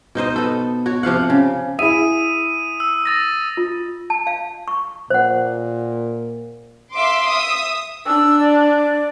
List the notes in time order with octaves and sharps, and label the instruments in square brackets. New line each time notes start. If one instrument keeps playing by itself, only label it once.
[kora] B2 D#4 C5 D#5
B3 A4
F#4 C#5
C3 F3 F5 F#5
C#3
[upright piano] E4 G#4 E5 [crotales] D#6 D#7
[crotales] E6
D#6 A6 A#6
[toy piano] F4
A5
F5
C#6
[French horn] A#2 [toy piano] C5 F#5
[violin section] E5 F5 C6 D6
E5 D#6
[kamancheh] D4 [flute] E6
[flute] D5